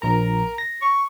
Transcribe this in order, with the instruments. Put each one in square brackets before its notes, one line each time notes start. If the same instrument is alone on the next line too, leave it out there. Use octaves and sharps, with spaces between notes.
[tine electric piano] A#1 A#5 [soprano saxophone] A#4
[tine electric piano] A#6
[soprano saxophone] C#6